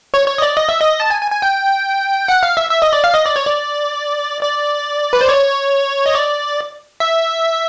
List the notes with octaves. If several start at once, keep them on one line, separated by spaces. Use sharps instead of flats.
C#5
C#5
D#5
D5
D#5
E5
D#5
A5
G#5
G#5
G#5
G5
F#5
F5
E5
E5
D#5
D5
F5
D#5
D5
C#5
D5
D5
B4
C5
C#5
D#5
D5
E5